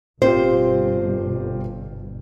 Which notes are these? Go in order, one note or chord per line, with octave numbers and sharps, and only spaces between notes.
G1 B2 C4 F4 G4 C5